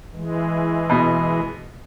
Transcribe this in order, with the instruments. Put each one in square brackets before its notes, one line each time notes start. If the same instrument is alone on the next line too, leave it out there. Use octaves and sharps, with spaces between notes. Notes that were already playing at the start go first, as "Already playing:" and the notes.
[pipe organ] E3 G#3
[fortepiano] B2